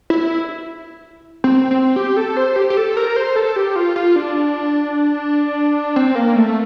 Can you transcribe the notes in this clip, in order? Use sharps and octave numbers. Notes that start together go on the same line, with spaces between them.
E4
C4
C4
G4
A4
C5
G4
G4
A4
A#4
C5
A4
G4
F4
F4
D4
C4
A#3
A3